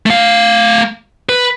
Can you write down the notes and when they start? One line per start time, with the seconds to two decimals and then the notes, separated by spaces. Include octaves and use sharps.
0.06 A3 F5
1.29 B4